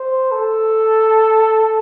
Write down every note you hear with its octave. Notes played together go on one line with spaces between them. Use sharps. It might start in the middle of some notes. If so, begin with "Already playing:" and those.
Already playing: C5
A4